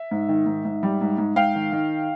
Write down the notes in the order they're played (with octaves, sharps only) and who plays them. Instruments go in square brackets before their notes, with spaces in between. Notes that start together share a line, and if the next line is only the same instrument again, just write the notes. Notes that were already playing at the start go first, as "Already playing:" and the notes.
Already playing: [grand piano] E5
G#2
D#3
G#2
G#2
G3
G#2
G#2
G#2 F5 G5
D#3
D#3